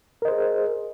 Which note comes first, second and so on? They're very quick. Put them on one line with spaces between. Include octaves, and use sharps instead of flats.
A#4 D#5 C5 G#4